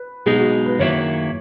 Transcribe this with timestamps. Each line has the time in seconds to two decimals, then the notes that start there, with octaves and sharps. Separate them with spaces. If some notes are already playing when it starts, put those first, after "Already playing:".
Already playing: B4
0.26 B1 B2 G#3 D#4 G#4
0.39 F#4
0.66 B4
0.79 F#2 D#3 F#3 A#3 E4 C#5